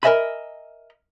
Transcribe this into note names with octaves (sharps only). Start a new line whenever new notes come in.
A#4 C5 D#5 E5 G#5 B5